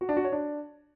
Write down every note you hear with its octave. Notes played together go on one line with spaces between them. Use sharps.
F#4
D4
F#4
C#5
D4